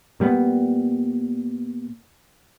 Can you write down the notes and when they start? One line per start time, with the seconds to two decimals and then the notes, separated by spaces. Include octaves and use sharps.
0.20 A#2 G3 A3 B3